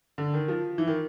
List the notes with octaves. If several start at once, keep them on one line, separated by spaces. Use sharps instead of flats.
D3
D#3
F3
E3
D#3